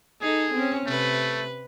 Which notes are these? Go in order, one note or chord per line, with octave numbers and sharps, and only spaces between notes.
D#4 G#4 A4
C4 C#4
C3 A3 B4